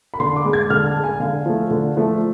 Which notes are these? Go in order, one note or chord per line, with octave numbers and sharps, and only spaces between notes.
B5
D3 C6
D6
G#3
G#6
D3 F6
A5
G#3
G#5
D3 F5
F3 A3
D3
F3 A3